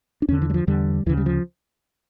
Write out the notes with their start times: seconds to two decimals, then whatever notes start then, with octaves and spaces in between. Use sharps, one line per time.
0.22 D4
0.28 E2 D3 C#4
0.42 E3
0.50 G3
0.54 F3
0.67 E2 D3 G3
1.06 D2 C#3 E3
1.17 G3
1.26 F3